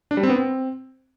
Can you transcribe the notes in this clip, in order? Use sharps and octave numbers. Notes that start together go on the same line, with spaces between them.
D4
G3
C4
B3
C4